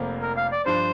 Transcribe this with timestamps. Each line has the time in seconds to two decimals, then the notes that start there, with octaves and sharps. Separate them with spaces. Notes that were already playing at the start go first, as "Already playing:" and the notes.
Already playing: F1 F2 F3 A#3
0.22 A#4
0.37 F5
0.52 D5
0.65 G2 F3 D4 C5